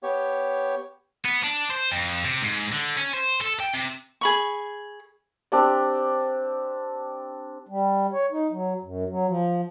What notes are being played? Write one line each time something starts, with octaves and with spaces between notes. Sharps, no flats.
B3 G4 C#5
B3
D4
C5
F2
C3
G#2
D3
C#4
C5
A4
G5
C3
G#4 B5 C#6
C4 D4 G4 D5
G3
C#5
D#4
F#3
F#2
F#3
F3